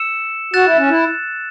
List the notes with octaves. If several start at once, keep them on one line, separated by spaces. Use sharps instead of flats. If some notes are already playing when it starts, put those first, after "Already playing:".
Already playing: E6 C#7 E7
F#4 F#6 A6 E7
E4
C#4
E4